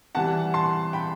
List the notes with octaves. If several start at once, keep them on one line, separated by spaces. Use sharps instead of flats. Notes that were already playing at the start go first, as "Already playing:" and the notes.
C3 E3 G3 F#5 A5
A5 C6
G5 B5